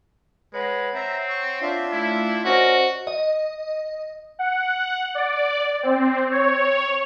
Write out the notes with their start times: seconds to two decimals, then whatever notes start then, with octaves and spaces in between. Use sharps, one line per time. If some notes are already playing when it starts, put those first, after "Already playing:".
0.54 G#3 B4 C#5 F#5
0.94 C4 E5 A#5
1.29 C#6
1.62 D4 F4 E5
1.92 A3 E4
2.45 C#4 F#4 A#4 C5 D5 D#5
3.07 D#5
4.39 F#5
5.15 D5
5.83 C4
6.31 C#5